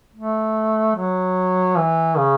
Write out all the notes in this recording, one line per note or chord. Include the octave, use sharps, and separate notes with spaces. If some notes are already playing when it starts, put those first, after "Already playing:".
A3
F#3
E3
C#3